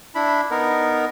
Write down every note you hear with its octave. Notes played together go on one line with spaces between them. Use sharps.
D4 E4 B5
B3 D#4 A#4